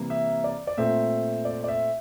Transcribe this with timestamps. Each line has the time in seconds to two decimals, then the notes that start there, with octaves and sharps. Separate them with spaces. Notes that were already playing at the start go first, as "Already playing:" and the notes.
Already playing: C3 E3 G3 A#3
0.10 E5
0.44 D5
0.67 D5
0.77 A#2 A3 C4 E5
1.45 D5
1.64 D5
1.68 E5